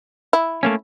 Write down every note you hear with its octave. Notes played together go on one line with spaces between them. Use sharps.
E4
A3 A#3 C#4